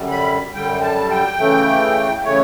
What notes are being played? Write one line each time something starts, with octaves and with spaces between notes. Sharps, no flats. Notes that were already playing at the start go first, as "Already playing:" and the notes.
Already playing: F#2 D3 G3
B5
F#2 D3 G3 G5
A5
G5
C#3 E3 A3
C#3 E3 A3 C#5